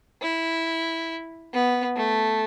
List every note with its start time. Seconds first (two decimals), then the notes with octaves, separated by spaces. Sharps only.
0.22 E4
1.53 B3
1.96 A3